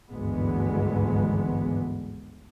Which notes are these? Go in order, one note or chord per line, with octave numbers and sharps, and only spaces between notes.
G#1 D2 G2 E3 G#3 B3